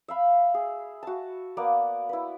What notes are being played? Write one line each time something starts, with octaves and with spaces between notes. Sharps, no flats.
E5 F5 B5
G#4
F#4 A5
A#3 B3 D5
E4 B4